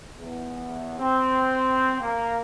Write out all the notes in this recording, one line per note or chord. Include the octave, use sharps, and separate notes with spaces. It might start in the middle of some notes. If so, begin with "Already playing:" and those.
E2
C4
A#3